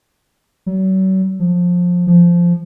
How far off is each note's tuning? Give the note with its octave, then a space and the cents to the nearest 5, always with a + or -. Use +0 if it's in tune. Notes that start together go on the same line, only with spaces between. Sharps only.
F#3 +40
F3 +20
F3 -10